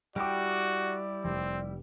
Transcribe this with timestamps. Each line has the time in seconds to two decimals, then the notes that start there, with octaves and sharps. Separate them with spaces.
0.16 G3 E4 F#4 G4 D5 G5 D6
1.24 F1 C4